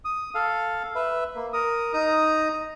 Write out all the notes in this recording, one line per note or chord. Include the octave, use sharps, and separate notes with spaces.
D#6
A4 F5
B4 E5
A#3
A#4 D#6
D#4 A#5 D#6